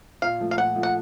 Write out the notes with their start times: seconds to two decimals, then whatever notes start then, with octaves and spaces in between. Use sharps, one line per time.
0.22 A#2 F5
0.40 F3 A3
0.51 F5
0.57 A#2 F#5
0.76 F3 A3
0.83 F#5